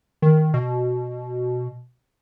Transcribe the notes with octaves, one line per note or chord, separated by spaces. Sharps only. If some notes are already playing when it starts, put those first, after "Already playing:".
D#3
B2